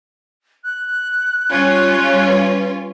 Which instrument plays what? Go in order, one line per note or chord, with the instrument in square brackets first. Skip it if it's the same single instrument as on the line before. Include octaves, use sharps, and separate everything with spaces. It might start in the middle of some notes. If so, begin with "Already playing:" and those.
[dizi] F#6
[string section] G3 C#4 F4
[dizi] B4